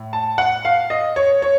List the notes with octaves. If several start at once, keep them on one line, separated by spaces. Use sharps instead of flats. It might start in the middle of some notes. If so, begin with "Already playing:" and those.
Already playing: A2
A5
F#5
F5
D#5
C#5
C#5